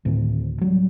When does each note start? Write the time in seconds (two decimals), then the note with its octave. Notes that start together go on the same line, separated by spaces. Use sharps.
0.05 D2 A2 D#3 C4
0.61 F#3 G3